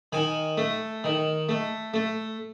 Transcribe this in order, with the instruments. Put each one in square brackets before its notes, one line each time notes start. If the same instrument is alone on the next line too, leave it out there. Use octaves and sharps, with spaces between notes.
[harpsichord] D#3 G#5
A3
D#3
A3
A3